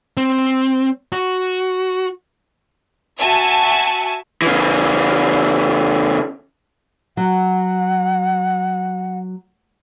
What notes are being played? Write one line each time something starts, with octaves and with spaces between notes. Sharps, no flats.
C4
F#4
F#4 E5 G#5 A5
C#3 E3
F#3 F#5